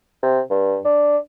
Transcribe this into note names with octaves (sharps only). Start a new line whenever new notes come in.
C3
G2
D4